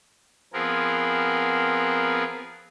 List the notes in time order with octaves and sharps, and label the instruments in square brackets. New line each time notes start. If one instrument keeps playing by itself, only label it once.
[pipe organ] F3 B3 C4 G#4 A#4